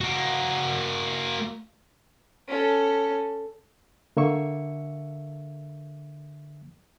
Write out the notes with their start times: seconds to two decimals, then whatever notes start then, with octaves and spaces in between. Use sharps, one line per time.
0.01 A#3 F#4
2.48 C#4 A4
4.17 D3 A#3 E5 C#6